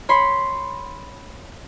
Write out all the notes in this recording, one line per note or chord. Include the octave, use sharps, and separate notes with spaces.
C#5 B5 C6